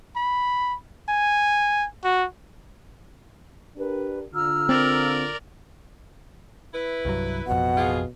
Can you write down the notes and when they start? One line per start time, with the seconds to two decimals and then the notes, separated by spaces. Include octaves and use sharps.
0.16 B5
1.09 G#5
2.04 F#4
3.77 D4 G4 A#4 B4
4.34 D3 F4 A#5 E6 F6
4.69 C4 A#4 D5
6.74 E4 B4
7.05 C2 G2 F#3
7.47 A1 F2 B2 F#5
7.77 F4 G4 G#4